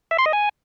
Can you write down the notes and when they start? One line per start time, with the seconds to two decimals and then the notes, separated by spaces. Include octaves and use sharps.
0.11 E5
0.18 C6
0.26 D#5
0.33 G#5